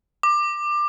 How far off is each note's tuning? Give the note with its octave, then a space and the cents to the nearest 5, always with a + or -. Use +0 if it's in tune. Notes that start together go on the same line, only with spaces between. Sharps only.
D6 +20